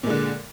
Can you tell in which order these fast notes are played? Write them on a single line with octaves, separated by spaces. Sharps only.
A#2 G#3 D3